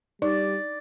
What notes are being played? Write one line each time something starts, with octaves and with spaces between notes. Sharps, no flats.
G3 D#4 D5